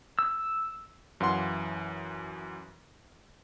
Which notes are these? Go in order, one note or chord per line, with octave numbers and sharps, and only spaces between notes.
E6
F#2 E3 F5 F#5 C6